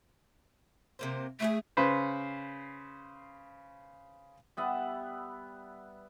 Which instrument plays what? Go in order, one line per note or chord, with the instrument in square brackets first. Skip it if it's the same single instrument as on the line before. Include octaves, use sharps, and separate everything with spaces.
[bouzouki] C3 A#3 C5
[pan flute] A3 [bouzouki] E4 F#4 G#4
[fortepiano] C#3 B4 C5
[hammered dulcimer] G3 B3 E5 F#5